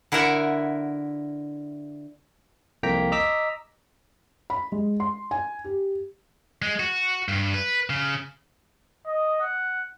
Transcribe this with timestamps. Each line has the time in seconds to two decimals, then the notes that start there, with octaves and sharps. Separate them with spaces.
0.12 D3 E4 A#4 E5 F#5 G#5
2.83 C2 F2 A#3 G5 A#5 B6
3.12 D#5 A#5 D6 E6 B6
4.50 B5
4.72 G#3
5.00 C6
5.31 G#5
5.64 G4
6.62 G#3
6.80 F#4
7.28 G2
7.54 B4
7.90 C#3
9.06 D#5
9.41 F#5